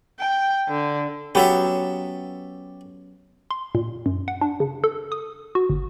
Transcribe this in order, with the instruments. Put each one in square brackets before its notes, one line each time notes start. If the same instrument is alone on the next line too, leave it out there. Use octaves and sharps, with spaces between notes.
[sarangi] G5
D3
[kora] F#3 B3 C#4 [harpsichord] G4 A4 E5
[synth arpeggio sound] C6
A#2
F#2
F#5
D4
C#3
A4
D#6
F#4
G1